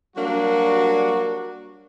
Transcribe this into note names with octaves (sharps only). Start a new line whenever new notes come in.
F#3 G3 A#3 D4 F#4